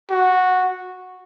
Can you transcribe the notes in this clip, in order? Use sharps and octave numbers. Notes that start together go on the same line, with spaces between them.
F#4